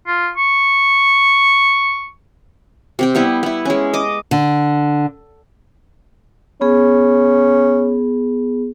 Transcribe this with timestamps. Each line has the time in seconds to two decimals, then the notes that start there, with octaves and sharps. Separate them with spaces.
0.07 F4
0.37 C#6
2.99 C3 C4 G5
3.15 G3 B3 E4
3.43 B3 E4
3.65 G#3 C#4
3.93 D#5 D6
4.31 D3
6.61 B3 C#4 G#4